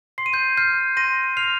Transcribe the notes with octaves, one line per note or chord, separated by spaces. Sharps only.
C6 C7
D#7
G6 C7
F6 G6 C7
C6 A#6 D#7
F6 C7 F7